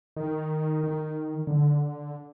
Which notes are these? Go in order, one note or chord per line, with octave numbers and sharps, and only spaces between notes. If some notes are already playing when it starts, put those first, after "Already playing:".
D#3
D#3
D3